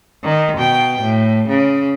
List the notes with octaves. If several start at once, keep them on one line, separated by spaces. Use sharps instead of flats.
D#3
B2 G5
A2
C#3